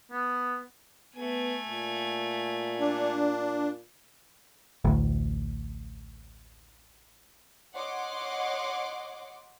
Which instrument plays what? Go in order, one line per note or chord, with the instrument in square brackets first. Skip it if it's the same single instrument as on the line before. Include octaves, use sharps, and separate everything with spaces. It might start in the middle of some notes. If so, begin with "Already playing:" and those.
[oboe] B3
[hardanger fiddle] A3 G#5 [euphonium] B3
[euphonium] A#2
[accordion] D4
[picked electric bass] A1 D2 A2
[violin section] C#5 D#5 F#5 C6 D6